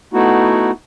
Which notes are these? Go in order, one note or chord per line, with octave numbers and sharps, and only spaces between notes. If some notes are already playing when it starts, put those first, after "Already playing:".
A3 B3 D#4 E4 F#4